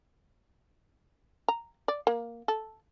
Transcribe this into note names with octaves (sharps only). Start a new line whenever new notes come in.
A#5
D5
A#3
A4